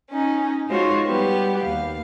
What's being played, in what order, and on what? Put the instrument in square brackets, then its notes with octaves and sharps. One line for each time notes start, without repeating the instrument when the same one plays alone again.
[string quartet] C#4 D#4
G#3 D#4 F4 F#4 C5 C#5
G3 B3 G4
D#2 F5